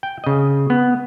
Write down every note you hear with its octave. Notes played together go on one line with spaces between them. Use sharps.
G5
C#3 D#5
B3